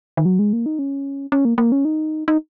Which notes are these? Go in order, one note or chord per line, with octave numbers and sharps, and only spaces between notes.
D#3
F#3
G#3
A#3
D#4
C#4
C#4
A#3
A#3
C#4
D#4
D#4